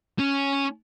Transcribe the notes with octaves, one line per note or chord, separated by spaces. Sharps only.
C#4